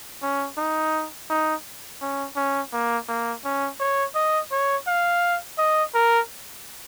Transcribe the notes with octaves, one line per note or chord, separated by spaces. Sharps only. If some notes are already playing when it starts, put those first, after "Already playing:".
C#4
D#4
D#4
C#4
C#4
A#3
A#3
C#4
C#5
D#5
C#5
F5
D#5
A#4